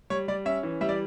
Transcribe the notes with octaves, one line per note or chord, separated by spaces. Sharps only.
G3 C#5
G3 D5
C#4 E5
E3
G3 E5
D5